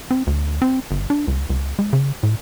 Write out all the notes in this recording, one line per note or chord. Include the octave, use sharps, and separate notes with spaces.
C4
D2
C4
G1
D4
C#2
C#2
G#3
C#3
A2